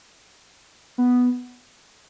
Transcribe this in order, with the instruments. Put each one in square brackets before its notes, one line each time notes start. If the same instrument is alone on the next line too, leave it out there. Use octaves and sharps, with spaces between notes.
[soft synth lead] B3